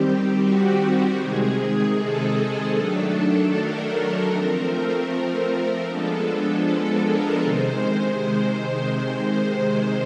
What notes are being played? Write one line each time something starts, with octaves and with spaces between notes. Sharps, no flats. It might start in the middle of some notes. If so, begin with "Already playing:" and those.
Already playing: D#3 G3 C4 G4
F#4
C3 D#3 G#3 G#4
A4
D#3 F#3 A3 D4
A#4
F3 A3 C4
F3 G#3 B3 D4 A4
A4
A#4
C3 D#3 G#3 C5
C5